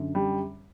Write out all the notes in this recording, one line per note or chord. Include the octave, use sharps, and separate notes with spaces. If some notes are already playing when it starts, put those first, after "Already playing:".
Already playing: F#2 D3
G3